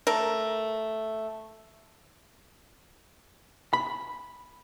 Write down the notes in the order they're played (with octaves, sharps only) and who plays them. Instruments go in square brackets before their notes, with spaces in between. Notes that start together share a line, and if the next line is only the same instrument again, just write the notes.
[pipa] A3 A#4
[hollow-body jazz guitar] B5